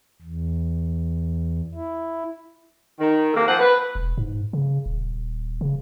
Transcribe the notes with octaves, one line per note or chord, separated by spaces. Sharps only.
E2
E4
D#3
C3 A3 A#3
F3 C4 F#5
B4
E1
G#2
C#3
D#1
C#3